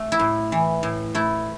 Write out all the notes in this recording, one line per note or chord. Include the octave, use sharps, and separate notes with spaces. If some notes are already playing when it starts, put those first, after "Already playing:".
Already playing: A3
E4
A2
E3
A2
A3 E4